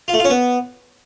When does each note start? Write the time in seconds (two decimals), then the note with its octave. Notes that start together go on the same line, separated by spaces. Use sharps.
0.08 F4
0.14 A3
0.19 F4
0.25 C#4
0.30 B3